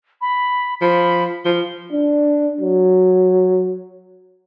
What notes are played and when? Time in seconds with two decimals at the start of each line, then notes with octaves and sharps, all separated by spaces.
0.21 B5
0.82 F3 B5
1.45 F3 G7
1.92 D4
2.61 F#3